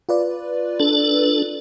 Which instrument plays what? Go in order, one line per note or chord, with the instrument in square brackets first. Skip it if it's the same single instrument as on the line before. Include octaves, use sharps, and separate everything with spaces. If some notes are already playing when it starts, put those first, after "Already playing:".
[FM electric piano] F4 B4 D5
[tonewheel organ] D4 A4